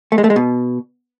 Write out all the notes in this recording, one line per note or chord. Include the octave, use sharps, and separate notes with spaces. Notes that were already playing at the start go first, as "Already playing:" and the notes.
A3
G#3
A3
G#3
B2